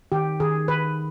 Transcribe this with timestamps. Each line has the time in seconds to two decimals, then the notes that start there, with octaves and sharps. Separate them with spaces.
0.12 D#3 G4
0.40 D#3 G#4
0.68 D#3 B4